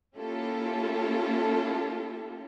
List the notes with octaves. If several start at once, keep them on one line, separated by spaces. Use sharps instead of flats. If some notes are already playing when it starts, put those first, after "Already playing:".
A#3 C#4 E4 F4 G4 A4